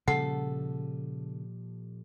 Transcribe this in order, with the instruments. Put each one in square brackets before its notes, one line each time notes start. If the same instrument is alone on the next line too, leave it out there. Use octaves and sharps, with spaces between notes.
[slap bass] A#2 F3 G3 [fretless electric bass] C#3 [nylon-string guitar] A4 [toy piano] F#5